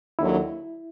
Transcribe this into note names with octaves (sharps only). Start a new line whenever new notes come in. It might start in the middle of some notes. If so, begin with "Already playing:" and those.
D#2 D3 F#3 E4